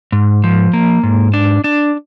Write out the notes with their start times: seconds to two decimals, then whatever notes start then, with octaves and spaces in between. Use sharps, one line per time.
0.12 G#2
0.44 F3
0.73 A#3
1.03 G#2
1.34 D4
1.64 D4